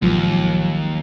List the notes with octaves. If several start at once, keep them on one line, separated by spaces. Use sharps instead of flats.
A1 D#2 F3 F#3 G#3